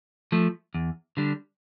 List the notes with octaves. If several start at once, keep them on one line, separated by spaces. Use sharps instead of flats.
F3 A3
E2
D3 G3 D4